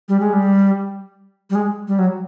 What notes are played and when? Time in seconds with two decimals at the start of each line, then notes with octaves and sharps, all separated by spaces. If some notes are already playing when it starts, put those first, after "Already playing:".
0.09 G3
0.20 G#3
0.33 G3
1.50 G3
1.55 G#3
1.88 G3
1.99 F#3